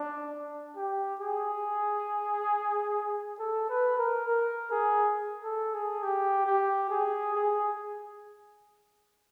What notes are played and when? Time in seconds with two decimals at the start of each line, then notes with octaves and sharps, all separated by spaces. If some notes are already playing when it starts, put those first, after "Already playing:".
Already playing: D4
0.76 G4
1.21 G#4
3.39 A4
3.69 B4
3.98 A#4
4.28 A#4
4.71 G#4
5.44 A4
5.74 G#4
6.03 G4
6.46 G4
6.90 G#4
7.35 G#4